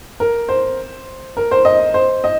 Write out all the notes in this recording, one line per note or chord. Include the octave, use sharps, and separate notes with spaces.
A#4
C5
A#4
C5
D#5
C5
D#5